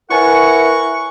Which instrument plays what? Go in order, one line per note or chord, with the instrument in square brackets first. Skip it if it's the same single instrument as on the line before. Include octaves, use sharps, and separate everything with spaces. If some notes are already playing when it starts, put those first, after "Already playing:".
[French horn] E4 [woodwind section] A#4 B4 F#5 [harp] C#5 G#5 A5 [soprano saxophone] C#6